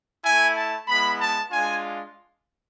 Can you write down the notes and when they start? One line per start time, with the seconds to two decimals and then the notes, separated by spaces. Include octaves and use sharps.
0.23 A3 E4 G#5
0.56 A5
0.87 G#3 B3 E4 B5
1.19 A5
1.52 G#3 D4 F4 G#5